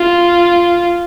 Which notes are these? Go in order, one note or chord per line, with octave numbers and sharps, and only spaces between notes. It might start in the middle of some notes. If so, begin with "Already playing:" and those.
Already playing: F4